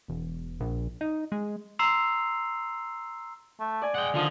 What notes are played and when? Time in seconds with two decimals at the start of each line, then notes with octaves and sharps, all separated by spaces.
0.08 E1
0.60 A#1
1.01 D#4
1.32 G#3
1.79 A#5 C6 E6 C7 F7
3.60 A3
3.82 D5 G#5
3.95 G#3 F#5 G5
4.15 D3 D#3 F3 F4 D#5